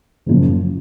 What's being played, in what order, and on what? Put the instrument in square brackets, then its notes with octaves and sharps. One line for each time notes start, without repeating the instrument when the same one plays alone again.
[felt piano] F#1 F#2 F3